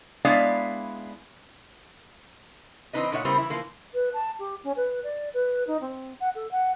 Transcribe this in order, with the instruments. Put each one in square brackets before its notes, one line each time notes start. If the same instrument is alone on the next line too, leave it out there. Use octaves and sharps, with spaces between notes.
[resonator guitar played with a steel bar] G#3 B3 D4 E4 D5 F5
E3 C4 D4 D#4 B4 D#5
A#2 A#3 D#4 C#5 E5 F#5
C#3 G3 B3 E4 A#4 C5
E3 E4
E3 F3 A#3
[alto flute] B4
A5
G4
C#4
B4
D5
B4
D#4
C4
F#5
A4
F#5